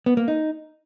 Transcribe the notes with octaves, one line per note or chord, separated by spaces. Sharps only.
B3
A#3
D#4